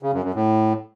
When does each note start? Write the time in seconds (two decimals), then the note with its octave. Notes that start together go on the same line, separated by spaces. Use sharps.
0.03 C#3
0.13 F#2
0.24 F#2
0.34 A2